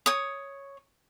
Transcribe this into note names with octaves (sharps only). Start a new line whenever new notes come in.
C#5 D#6